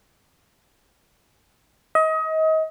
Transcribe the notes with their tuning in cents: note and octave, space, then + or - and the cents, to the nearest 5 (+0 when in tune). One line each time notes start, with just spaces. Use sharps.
D#5 +30